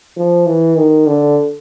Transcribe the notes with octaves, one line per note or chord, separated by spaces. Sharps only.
F3
E3
D#3
D3